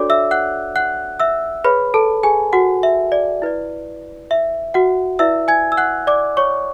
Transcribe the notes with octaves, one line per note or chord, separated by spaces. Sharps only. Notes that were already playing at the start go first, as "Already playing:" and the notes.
Already playing: D4 F#4 A4 C#5 D5 D6
E5 E6
F#5 F#6
F#5 F#6
E5 E6
G#4 B4 C#5 B5
A4 A5
G#4 G#5
F#4 F#5
E5
D5
E4 B4 D5
E5
F#4 F#5
E4 B4 D5 E5 E6
G#5 G#6
E6
F#5 F#6
D5 D6
C#5 C#6